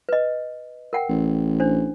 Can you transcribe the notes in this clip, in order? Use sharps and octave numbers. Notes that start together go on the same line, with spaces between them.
B4 D#5
A#4 F#5 G5
A1
D4 C5